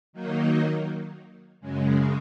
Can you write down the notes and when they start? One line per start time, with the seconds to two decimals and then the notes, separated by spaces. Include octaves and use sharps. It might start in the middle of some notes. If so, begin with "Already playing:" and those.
0.13 D#3 F#3 A#3 D#4
1.61 F#2 C#3 G#3